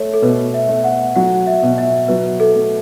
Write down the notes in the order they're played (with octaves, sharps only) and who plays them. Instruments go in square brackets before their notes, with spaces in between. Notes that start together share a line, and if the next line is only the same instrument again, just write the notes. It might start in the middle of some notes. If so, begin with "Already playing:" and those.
Already playing: [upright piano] A3 [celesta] C#5
[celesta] A4
[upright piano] B2 [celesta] B4
[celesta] E5
[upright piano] A3
[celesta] F#5
[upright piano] F#3 [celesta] F#5
[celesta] E5
[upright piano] B2
[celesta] E5
[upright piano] F#3 [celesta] B4
[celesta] A4
[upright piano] A3